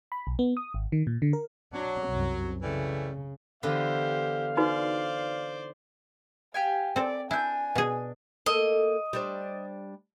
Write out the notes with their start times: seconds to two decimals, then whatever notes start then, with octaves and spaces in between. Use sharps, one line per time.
0.12 B5
0.27 B1
0.39 B3
0.57 D#6
0.74 G#1
0.92 D#3
1.07 A#2
1.22 D3
1.33 A#4
1.73 F#3 D4
2.08 C2 F#2
2.62 C#3 E3 G3 A3
3.63 D3 E3 B3 G4 C5 F5
4.57 D#4 F#4 B4 C5 D5
6.54 G4 F5 G5 G#5
6.96 C4 A4 D5
7.31 D4 E4 G#5 G6
7.75 B2 G#4
8.46 A#3 A4 D#5
9.13 G3 D4 C5